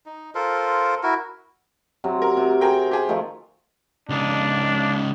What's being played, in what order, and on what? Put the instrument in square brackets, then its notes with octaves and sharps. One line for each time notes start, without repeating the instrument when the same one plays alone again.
[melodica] D#4
F4 A4 A#4 C5
E4 F#4 A#4
[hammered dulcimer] C3 F#3 C4
[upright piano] A#4
[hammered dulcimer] C3
[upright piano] G#4 A#4 G5
G4 G#4
[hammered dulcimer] D#3 F3 A3
[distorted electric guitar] C#2 D#4 [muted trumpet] D4